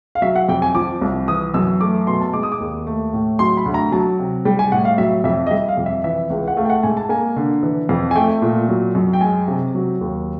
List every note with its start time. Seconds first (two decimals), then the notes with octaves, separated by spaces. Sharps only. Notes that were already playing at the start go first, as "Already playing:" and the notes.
0.15 F5
0.22 F#3 E5
0.36 F#5
0.49 F2 G5
0.62 G#5
0.75 F3 D6
1.02 C2
1.28 E3 D#6
1.54 F#2 E6
1.81 A3 D6
2.07 B2 C6
2.21 A5
2.33 G#3 D6
2.43 D#6
2.52 D6
2.60 D#2
2.87 A3
3.13 A2
3.39 F#3 C6
3.57 B5
3.66 D2
3.74 A#5
3.92 F#3 A5
4.19 C3
4.45 G3 G5
4.59 G#5
4.72 A2 F#5
4.85 F5
4.98 F#3 E5
5.24 F2 E5
5.47 D#5
5.51 G3 E5
5.69 F5
5.77 F2
5.86 E5
6.04 E3 E5
6.30 C#2
6.48 F#5
6.57 A3 F5
6.65 G5
6.70 F#5
6.83 G#2 G#5
6.97 A5
7.09 A#3 G#5
7.36 D3
7.63 E3
7.89 F2
8.11 G#5
8.15 A3 G5
8.42 A#2
8.69 F#3
8.95 F#2
9.13 G5
9.21 G#3 G#5
9.48 C3
9.75 F#3
10.01 D#2